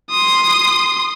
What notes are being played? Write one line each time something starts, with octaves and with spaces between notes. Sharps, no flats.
C6 D#6